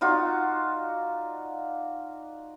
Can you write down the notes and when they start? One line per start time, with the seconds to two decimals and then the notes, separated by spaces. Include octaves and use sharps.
0.01 D#4 F4 F#4 D5